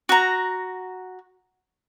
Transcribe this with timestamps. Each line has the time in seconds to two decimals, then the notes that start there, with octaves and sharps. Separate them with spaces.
0.09 F#4 A#5